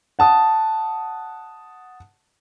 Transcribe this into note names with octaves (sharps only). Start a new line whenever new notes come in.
F#5 A5 D#6